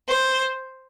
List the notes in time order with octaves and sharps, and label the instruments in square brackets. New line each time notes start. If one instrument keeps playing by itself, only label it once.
[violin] C5